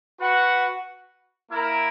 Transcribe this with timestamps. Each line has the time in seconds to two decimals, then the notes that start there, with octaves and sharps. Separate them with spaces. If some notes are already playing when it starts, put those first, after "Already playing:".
0.19 F#4 B4 F#5
1.50 A#3 E4 A#4